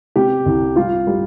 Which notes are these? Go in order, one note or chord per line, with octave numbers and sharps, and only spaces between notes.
C3 G4
C2
G3 F4
G3